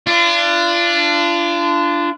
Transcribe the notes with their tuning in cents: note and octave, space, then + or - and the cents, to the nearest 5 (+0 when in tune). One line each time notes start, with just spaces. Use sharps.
D4 +0 F4 -35